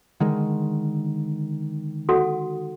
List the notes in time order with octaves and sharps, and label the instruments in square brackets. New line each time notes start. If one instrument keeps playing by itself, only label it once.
[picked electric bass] D3 D#3 G#3
[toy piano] F#4 A4 F#5